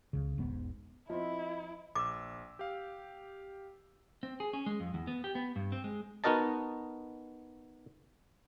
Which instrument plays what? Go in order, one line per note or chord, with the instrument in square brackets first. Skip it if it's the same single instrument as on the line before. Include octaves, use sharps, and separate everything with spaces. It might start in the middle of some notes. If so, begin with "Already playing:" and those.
[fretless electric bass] C#2 C#3
E1 B1 G#2 B3
[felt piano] F3 C4 [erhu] E4 [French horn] D#5
[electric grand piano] A#1 E6 [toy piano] D6
[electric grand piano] G4 F5
[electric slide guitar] C4
G#4
C#4
G#3
F2
E2
B3
G4
B3
G2
C4
G#3
[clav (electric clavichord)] B3 D#4 F#4 A#4 D#5 A5